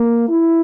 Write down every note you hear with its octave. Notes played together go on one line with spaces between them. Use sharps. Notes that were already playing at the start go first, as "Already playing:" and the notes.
Already playing: A#3
E4